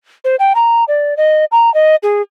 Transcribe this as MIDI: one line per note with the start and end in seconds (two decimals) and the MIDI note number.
0.25 0.36 72
0.40 0.53 79
0.55 0.84 82
0.88 1.17 74
1.17 1.45 75
1.52 1.72 82
1.74 1.96 75
2.03 2.22 68